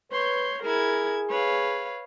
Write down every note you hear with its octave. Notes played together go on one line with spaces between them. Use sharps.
B4 C#5 C6 G6
E4 G#4 A#4 G#6
B4 C#5 F5